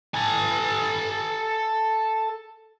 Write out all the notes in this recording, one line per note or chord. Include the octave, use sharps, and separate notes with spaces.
A4 G#5